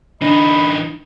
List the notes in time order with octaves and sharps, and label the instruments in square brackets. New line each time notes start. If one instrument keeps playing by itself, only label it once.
[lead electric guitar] E3 D#4 [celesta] D4 [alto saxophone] D#5 [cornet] B5